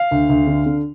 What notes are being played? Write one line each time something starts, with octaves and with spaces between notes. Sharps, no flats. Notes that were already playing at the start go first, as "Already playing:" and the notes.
Already playing: F5
D2
D2
D3
D3